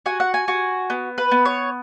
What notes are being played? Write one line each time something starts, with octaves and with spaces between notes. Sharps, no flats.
F#4 G#5
F#5
G#5
F#4
B3
B4
B3
C#5